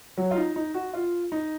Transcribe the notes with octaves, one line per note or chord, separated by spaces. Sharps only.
F#3
F4
D#4
D#4
F#4
F4
D#4